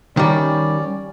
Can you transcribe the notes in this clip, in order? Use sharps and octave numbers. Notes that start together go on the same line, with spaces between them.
D#3 G3 C#4 D5